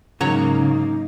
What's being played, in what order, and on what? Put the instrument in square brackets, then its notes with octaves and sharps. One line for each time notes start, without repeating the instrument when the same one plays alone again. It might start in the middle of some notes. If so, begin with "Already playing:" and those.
[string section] G#2 A#3 [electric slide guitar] C#3 [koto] F#3 C#5 A#5 [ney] D#4